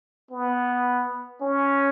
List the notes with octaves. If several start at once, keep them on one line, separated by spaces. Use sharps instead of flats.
B3
C#4